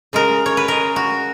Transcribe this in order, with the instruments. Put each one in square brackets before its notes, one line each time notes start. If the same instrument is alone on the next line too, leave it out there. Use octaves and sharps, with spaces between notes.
[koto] C#3 G#3 A#4
C#5
B4
C#3 G#3 A#4
F#4